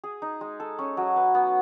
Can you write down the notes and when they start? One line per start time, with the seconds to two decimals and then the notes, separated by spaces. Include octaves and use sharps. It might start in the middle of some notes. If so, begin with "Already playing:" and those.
0.04 G#4
0.22 D#4
0.41 G#3
0.60 A4
0.79 C#4
0.97 F#3
1.16 B4
1.35 B3